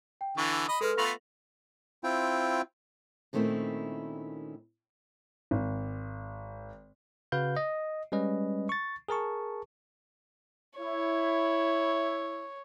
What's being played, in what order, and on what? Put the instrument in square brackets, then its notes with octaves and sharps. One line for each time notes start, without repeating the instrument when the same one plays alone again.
[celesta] G5
[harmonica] D3 E3 [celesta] C#6
[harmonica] D#5 B5 D#6
[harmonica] G#3 [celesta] A4 B4 F6
[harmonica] A3 B3 F4 [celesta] A#6 F7 F#7
[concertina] C4 E4 F4 G5
[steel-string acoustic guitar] A#2 D#3 A3 C4 C#4 E4
[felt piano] G#1
[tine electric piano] C#3 F#4 B4 F5 G6
D#5
G3 G#3 C#4 B4 D#5
C#6 A6
G#4 A#4 A5 C#6
[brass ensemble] E4 [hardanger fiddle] C#5